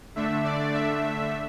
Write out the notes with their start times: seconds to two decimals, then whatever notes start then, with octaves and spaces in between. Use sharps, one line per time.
0.16 D3 A3 D4 E5
0.44 D5
0.74 E5